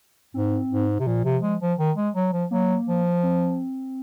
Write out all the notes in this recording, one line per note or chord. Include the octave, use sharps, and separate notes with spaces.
G#2 C4
G#2
C3
A#2 F3
C3
G#3
F3
D#3
G#3
F#3
F3
F#3 A#3
F3
C4